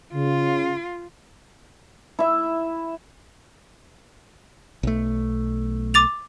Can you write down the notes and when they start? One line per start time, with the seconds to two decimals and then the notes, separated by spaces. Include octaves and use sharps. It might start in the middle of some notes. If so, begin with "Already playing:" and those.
0.15 C#3 F4
2.19 E4 E5
4.83 B1 A3
5.94 D6 A6 F7